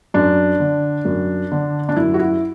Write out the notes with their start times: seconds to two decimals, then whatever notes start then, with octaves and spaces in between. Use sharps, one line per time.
0.14 F#2 D4
0.60 D3
1.05 F#2
1.52 D3
1.89 D4
1.96 F#2 E4
2.14 F#4
2.19 E4